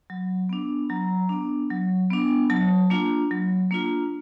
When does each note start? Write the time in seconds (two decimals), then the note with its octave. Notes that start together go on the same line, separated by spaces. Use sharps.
0.10 F#3
0.49 B3 D4
0.89 F#3 A#5
1.29 B3 D4
1.70 F#3
2.10 B3 D4
2.50 F#3 A5
2.90 A#3 D4 F4
3.31 F#3
3.71 A#3 D4 F4